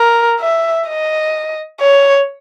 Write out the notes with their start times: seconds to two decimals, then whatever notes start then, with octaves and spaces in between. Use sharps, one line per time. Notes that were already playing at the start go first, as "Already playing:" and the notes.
Already playing: A#4
0.40 E5
0.88 D#5
1.81 C#5